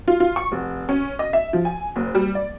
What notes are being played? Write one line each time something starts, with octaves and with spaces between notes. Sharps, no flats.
F4
F4
C#6
F1
C#4
D#5
E5
F3
G#5
F#1
G3
D5